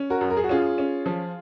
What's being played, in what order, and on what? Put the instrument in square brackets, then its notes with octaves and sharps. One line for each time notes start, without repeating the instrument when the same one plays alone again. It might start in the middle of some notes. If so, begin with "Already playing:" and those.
Already playing: [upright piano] C#4
[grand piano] F#4 A#4
[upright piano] F#2
[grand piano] A#4
G#4
F#4
[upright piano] C#4 [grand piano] F4 G#4
[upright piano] C#4
F3